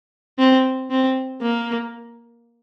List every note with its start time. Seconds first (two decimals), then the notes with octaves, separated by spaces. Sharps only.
0.39 C4
0.91 C4
1.42 A#3